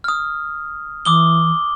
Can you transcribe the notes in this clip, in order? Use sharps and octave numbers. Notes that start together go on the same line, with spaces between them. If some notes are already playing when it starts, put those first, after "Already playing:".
D#6 F6
E3 D6 D#6 G7